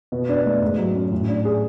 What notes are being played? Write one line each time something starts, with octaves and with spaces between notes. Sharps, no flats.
B2
D4
A3
G#2
F#3
C#4
A2
D4
G#4